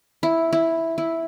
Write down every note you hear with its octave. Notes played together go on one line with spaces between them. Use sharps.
E4
E4
E4